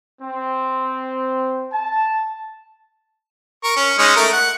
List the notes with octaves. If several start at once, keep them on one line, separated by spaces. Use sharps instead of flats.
C4
A5
A#4 C#6
C#4
G#3 C#4 D#4
A3 A#4
F#5